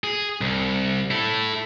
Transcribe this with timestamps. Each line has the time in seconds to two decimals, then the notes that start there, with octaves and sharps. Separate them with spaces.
0.04 G#4
0.41 C2
1.11 E4 A4